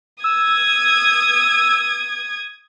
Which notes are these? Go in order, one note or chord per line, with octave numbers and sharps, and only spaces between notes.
D#6 E6 G#6